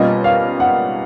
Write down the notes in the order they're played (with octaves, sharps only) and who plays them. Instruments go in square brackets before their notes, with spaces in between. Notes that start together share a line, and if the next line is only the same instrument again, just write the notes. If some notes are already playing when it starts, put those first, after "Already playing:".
Already playing: [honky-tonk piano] B2 G3 A#3 C#4 F4 [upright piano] D#5
[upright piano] F5
F#5